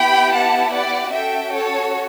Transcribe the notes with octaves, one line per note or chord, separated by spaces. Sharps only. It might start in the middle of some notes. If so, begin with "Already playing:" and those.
Already playing: B3 E4 G4 G5 B5
F#5 A5
D5 F#5
C#4 F#4 A4 E5 G5
A4 C#5